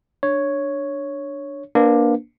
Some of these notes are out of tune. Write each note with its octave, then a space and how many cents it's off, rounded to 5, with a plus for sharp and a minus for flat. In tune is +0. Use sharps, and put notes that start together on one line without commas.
D4 +5 C#5 +0
A#3 +20 D4 +0 B4 +35